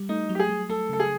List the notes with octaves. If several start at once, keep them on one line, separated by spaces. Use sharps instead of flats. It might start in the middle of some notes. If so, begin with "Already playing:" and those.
Already playing: G3
A3 D#4
F#3
G4
G#4
F#3
A3 A4
C#3 A4
G#4